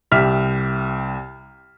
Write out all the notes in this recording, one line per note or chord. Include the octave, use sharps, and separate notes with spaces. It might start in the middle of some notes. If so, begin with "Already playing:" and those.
C2 G4 E5 F6 B6